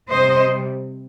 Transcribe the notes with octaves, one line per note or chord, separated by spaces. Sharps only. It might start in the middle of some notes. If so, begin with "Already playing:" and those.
C3 G3 C5 D#5